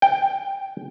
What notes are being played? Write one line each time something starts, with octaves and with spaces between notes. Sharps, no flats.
G5